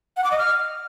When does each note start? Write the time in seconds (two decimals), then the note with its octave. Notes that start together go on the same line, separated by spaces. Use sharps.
0.17 F#5
0.24 D6
0.31 D#5
0.38 F6